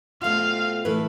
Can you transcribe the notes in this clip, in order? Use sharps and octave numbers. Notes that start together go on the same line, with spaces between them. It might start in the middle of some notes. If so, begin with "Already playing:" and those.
B2 A3 C4 F4 F5
A2 E3 A3 E4 B4